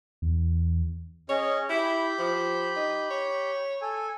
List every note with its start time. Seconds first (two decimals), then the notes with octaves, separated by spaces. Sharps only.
0.22 E2
1.29 C#4 G#4 C#5 D#5
1.70 E4 G4 B5 G6
2.18 F3
2.76 D#4
3.11 C#5
3.82 A4 G#5